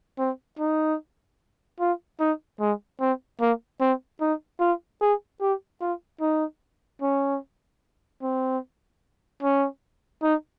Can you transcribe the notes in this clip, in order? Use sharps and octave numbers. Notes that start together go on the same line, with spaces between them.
C4
D#4
F4
D#4
G#3
C4
A#3
C4
D#4
F4
G#4
G4
F4
D#4
C#4
C4
C#4
D#4